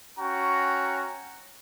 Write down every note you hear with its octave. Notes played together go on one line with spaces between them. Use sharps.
C#4 F#4 G5 A#5